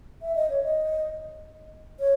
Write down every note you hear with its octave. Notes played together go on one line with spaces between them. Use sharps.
E5
D#5
C#5
D#5
C#5